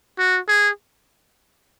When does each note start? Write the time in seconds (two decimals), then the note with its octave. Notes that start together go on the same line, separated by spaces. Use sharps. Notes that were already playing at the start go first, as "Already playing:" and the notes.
0.19 F#4
0.48 G#4